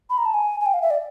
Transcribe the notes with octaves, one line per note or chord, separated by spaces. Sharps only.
B5
A#5
A5
G#5
G#5
G5
F5
E5
D5